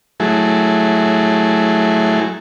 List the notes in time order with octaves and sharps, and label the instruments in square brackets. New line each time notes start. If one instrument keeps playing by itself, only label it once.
[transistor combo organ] F#3 A3 E4 G#4